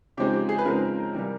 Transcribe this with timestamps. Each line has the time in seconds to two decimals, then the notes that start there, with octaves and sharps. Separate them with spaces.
0.17 C#3 F3 G#3 C4 D#4 G4
0.33 G4
0.49 G#4
0.58 B4
0.65 C#3 F3 G#3 C4 D#4 A#4
1.13 C3 E3 G3